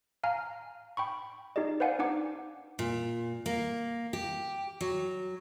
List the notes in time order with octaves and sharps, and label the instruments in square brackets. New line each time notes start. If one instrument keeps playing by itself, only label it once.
[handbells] F5 G#5 A#5 F6
G5 B5 C#6
D#4 G4 G#4 D5 D#5
B4 C5 D5 F5 F#5 G#5
D4 D#4 F#5 D6
[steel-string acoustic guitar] A#2
A#3
G4
F#3